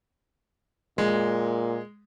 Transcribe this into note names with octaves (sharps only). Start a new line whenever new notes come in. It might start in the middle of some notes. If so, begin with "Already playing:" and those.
A#2 G#3